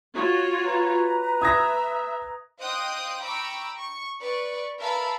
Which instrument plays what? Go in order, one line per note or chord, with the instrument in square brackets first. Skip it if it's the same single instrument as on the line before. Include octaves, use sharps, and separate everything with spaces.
[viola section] F4 F#4 C#5
[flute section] B4 A#5
[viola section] E5 [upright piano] D#6 G#6 A#6
[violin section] C5 D#5 F5 G5 D#6 F#6
G5 A#5 B5 C#6 D6 E6
C#6
B4 D5 C#6
A#4 B4 E5 F5 A5 B5